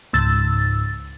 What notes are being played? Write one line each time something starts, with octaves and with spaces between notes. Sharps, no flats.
C#2 G#2 E6 A6